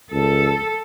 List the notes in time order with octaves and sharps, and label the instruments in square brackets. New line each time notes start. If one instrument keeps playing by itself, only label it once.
[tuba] C#2 [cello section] A4